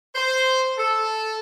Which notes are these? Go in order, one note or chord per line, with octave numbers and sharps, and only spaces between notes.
C5
A4